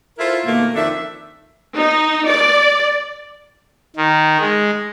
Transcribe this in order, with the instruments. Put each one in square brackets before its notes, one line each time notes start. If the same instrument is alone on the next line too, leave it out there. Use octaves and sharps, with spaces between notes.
[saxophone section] E4 F4 A4 A#4 C5 E5
B2 D#3 A3 A#3
F2 D#3 D4 A4 E5
[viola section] D#4
D5
[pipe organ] D#3
G#3